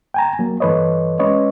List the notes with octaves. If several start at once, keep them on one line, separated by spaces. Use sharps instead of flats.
G5 G#5 A#5
F#3 A#3
G2 E3 A4 B4 C#5 D#5
G#3 C#4 B4 C#5 D#5